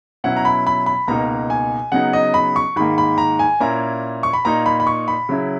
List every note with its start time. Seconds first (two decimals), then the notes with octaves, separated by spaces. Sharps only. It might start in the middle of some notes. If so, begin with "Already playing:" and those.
0.24 B2 F#3 C#4 E4 F#5
0.37 A#5
0.45 B5
0.67 B5
0.86 B5
1.08 C#2 B2 A#3 D#4 A#5
1.50 G#5
1.92 C#3 F#3 B3 D#4 F#5
2.13 D#5
2.34 B5
2.56 C#6
2.76 G#2 D#3 A#3 B5
2.98 B5
3.18 A#5
3.39 G#5
3.60 A#2 A#3 C#4 E4 A#5
4.23 C#6
4.33 B5
4.45 A#2 A#3 D#4 A#5
4.66 B5
4.80 B5
4.87 C#6
5.08 B5
5.29 C#3 F#3 C#4 E4